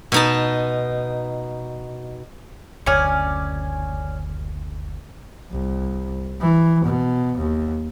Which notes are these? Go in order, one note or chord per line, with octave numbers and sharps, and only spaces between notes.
B2 D#4 A5
F#1 D2 C#4 C#5 D5 G#5 F6
C2
E3
B2
D#2